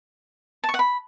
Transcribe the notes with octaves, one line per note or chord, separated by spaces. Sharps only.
A5
C#6
F#5
B5